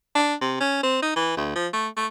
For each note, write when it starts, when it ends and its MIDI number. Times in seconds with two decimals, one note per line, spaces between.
0.15 0.34 62
0.41 0.56 48
0.60 0.83 61
0.83 0.99 60
1.02 1.11 63
1.16 1.35 52
1.37 1.55 38
1.56 1.67 53
1.73 1.88 57
1.97 2.07 57